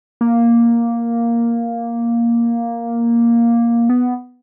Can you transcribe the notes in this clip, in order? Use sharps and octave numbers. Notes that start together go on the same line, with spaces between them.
A#3
B3